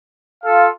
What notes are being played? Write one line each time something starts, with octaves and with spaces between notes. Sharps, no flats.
F4 A4 F5